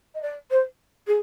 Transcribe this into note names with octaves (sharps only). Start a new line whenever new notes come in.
D#5
D5
C5
G#4